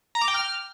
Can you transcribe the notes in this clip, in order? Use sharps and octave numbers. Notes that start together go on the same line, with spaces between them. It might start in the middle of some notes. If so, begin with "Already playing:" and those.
A#5
D6
G5
F6